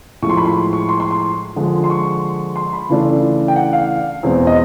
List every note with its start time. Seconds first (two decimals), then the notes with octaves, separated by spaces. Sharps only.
0.22 A2 F3 G#3 C#6
0.29 C6
0.37 B5
0.45 C6
0.73 C#6
0.89 C6
1.00 C6
1.11 C6
1.56 D3 F3 G#3
1.84 C6
1.90 C#6
2.56 C6
2.73 B5
2.89 C#3 E3 A3 D4
3.48 G5
3.56 F#5
3.73 F5
4.23 E2 B2 G#3 C4
4.47 D#5